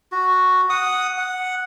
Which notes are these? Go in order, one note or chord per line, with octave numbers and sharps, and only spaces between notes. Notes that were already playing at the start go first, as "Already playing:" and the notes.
F#4
F#5 D#6
F#5